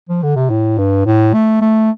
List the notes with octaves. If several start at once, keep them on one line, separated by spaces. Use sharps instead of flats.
F3
D3
C3
A2
G2
A2
A3
A3